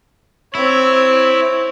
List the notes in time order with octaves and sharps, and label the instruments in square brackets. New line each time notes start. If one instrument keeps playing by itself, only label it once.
[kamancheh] C4 C#5 [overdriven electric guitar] E4